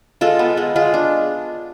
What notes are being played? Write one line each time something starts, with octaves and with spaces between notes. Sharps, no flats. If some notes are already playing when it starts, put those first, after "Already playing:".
G#3 F4 A4
B3
G#3
G#3 F4
D4